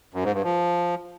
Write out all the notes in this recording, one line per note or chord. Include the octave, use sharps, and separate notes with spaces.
F#2
G#2
G2
F3